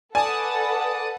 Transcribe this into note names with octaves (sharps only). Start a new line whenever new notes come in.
A4 B4 D5 F#5 G#5 A5 D#6